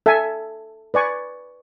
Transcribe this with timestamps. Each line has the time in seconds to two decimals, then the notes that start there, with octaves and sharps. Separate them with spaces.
0.06 A4 E5 G#5
0.94 B4 D5 G#5 C#6